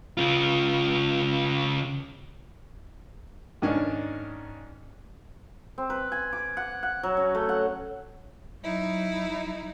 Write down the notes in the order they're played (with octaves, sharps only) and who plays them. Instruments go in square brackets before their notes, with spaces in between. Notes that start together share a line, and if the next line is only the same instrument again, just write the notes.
[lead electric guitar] C#3 F4
[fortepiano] G#2 D#3 C#4 D4
[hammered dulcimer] C4
B4
G#5
D6
F#5
F#5
F#3
C#4
A3
F#5
[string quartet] F#3 D#4 E4